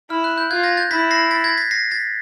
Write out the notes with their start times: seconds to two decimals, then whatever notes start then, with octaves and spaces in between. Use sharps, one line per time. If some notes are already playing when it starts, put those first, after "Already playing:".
0.10 E4 F6
0.24 F#6
0.38 G6
0.51 F4 F#6 G#6
0.63 G#6 A#6
0.77 G6 A6
0.91 E4 A6 B6
1.11 A#6 C7
1.31 A6 B6
1.44 G#6 A#6
1.57 A6 B6
1.71 A#6 C7
1.91 A6 B6